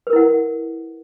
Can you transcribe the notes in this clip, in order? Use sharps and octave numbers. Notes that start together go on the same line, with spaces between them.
E4 A#4 B4 F#5